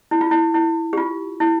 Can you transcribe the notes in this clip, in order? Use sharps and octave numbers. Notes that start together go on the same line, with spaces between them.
E4
F4
E4
E4
G4
F4
E4